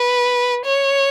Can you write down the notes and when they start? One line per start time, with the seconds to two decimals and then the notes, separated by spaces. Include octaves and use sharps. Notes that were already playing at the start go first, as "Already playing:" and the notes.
Already playing: B4
0.65 C#5